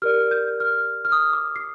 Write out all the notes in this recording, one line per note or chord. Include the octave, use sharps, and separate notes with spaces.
G4 A#4 D5 F6
G6
F6
F6
D#6
D6
C7